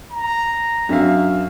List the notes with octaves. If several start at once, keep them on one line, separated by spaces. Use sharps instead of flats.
A#5
F#2 D4 F#4 E5 F5